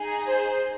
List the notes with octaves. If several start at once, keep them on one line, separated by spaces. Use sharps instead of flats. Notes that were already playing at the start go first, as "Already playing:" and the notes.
Already playing: D#4 G#4
C5